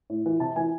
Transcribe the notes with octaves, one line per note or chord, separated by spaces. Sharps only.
A2
E3
C3 A5
E3 G#5